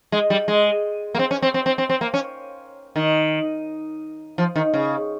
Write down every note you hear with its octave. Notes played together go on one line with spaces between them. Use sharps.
G#3
G3
G#3
A#3
C4
C#4
C4
C4
C4
C4
C4
A#3
C#4
D#3
F3
D#3
C#3